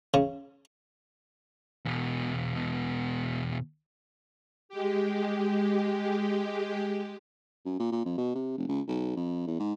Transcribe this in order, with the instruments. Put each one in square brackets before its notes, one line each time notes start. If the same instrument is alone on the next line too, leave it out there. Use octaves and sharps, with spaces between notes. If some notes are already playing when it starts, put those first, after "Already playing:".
[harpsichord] C#3
[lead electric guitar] E2 B2
[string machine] G#3 G4
[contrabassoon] F#2
A#2
A#2
F2
B2
C3
F1
C#2
B1
F2
E2
G#2